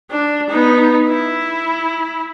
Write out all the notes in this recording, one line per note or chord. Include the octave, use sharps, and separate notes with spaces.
D4
B3 D#4
E4